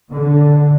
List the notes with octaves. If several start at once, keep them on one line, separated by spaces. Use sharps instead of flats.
D3